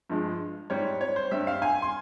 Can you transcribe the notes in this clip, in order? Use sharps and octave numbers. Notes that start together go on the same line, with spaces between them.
G2 F3 G#3
G#2 G3 C#5
C#5
C5
G2 G3 E5
F5
G#5
C6